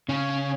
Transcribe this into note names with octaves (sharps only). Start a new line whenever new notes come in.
C#3 C#4